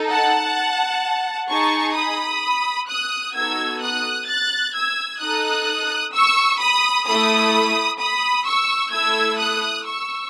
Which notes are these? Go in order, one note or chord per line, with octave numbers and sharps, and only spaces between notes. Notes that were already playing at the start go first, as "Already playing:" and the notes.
Already playing: D#4 A4
F#5 A5
D#4 G#4 A5 C#6
B5 D#6
D#6 F#6
B3 D#4 F#4 A4 E6 G#6
D#6 F#6
F#6 A6
E6 G#6
D#4 A4 D#6 F#6
C#6 E6
B5 D#6
A3 E4 A4 B5 D#6
B5 D#6
C#6 E6
A3 E4 A4 E6 G#6
D#6 F#6
C#6 E6